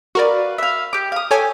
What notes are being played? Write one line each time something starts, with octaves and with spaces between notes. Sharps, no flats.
F#4 A#4 B4 D5 F5
E5 F5
G4 D6
F5 D#6
G4 A4 C#5 G#5